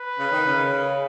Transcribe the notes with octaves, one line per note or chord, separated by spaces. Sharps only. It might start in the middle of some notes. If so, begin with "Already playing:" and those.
Already playing: B4
C#3
D#3
C#3